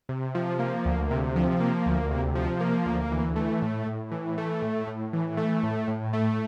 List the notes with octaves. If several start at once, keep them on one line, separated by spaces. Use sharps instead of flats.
C3
F3
A#3
D2
C3
F3
A#3
D2
C3
F3
A#3
D2
E3
A3
A2
A2
E3
A3
A2
A2
E3
A3
A2
A2
A3